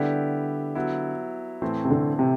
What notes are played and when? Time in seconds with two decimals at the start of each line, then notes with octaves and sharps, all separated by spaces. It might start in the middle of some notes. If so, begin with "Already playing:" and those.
Already playing: D3 G3 B3 E4 G4
0.75 F#3 B3 E4
1.62 A2 E3 A3 C4
1.85 C3
1.90 D3
2.19 C3